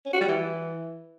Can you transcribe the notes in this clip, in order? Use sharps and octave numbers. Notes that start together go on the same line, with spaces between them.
C#4
F#4
G3
E3